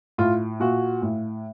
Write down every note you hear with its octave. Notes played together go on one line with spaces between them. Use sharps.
A2 F4
A#2 F#4
A2